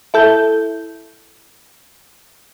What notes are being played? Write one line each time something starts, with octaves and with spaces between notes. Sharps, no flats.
E4 A4 G6